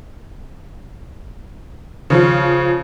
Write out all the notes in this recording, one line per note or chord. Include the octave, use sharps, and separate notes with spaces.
C#3 F3 F4